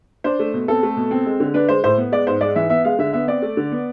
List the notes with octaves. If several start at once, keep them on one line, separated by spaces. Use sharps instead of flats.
D4 C5
A3
B2
C4 A4
A3
B2
C4
G#3
D3
D4 B4
G#3 C5
A2 C5
B3
G#3 D5
G#2 C5
G#3 D5
E3 E5
B3 E5
G#3 F5
D3 E5
B3 E5
C4 D5
A3
D3
B3